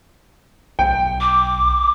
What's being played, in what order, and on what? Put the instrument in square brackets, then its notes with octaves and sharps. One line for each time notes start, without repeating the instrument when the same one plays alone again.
[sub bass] B1 [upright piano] G5
[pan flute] D6